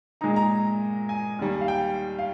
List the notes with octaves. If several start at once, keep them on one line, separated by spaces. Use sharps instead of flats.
A#2 G#3 D#4 A#5
A#5
G#5
D#2 D#3 G3
F5
G5
F5